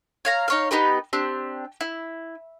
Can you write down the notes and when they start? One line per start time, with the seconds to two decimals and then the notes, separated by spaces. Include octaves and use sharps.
0.25 C#5 F5 A#5
0.48 D#4 C#5 F5
0.71 B3 D#4 G4 B4
1.13 C4 D4 G4
1.81 E4